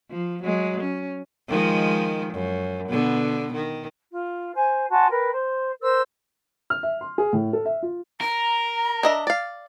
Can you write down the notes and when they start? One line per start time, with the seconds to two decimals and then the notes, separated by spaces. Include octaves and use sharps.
0.10 F3
0.43 F#3 G#3
0.80 C#4
1.48 D#3 F3 G#3
2.33 F#2
2.89 B2 D3 B3
3.53 D#3
4.10 F4
4.54 C5 G#5
4.90 F#4 G#5 A5 C6
5.10 A#4 B4 G5
5.33 C5
5.81 A#4 C5 E6
6.70 F6
6.83 E5
7.01 C6
7.18 G#4
7.33 A2
7.53 A4
7.65 E5
7.82 F4
8.21 A#4 A#5
9.03 D4 D#5 E5
9.27 D5 F5